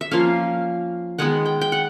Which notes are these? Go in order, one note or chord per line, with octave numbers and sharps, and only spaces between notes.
E5
F3 A#3 C#4 F5
D#3 G#3 B3 F#5
G5
G5
F#5